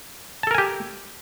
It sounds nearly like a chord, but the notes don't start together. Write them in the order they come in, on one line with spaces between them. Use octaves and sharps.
A5 A4 A#4 G#5 G4